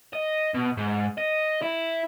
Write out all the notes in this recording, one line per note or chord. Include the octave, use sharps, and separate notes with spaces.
D#5
B2
G#2
D#5
E4